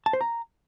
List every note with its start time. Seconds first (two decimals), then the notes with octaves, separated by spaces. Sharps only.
0.06 A5
0.13 C5
0.21 A#5